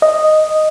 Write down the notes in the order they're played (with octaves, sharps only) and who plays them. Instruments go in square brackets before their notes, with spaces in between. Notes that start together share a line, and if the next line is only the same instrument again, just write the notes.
[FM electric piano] D#5